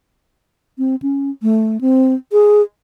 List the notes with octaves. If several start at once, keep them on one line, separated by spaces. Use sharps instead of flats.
C4
C#4
A3
C4
G#4